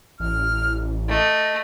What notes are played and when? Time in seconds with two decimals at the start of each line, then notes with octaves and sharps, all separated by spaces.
0.20 A1 F6
1.09 A3 D#5